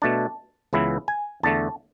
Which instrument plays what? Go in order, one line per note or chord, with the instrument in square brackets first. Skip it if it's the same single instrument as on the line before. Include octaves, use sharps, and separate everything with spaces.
[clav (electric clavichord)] B2 A3 D4 A5
C#2 C#3 E3 B3 E4
G#5
E2 D3 A3 A5